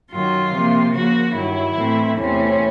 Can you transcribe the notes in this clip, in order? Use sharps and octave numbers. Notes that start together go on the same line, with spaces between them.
F#2 D#3 F#3 F4
C3 F3 A#3
C#3 F3 A#3 F#4
G2 D#3 F#3 E4
A2 E3 A3 C4
E2 C3 E3 A3 C4 C#4